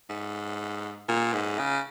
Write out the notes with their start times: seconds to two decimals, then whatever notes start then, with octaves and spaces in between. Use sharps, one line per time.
0.09 G#2
1.09 A#2
1.34 G#2
1.59 C#3